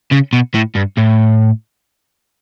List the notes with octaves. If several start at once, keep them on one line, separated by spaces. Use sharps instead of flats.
C#3
B2
A2
G2
A2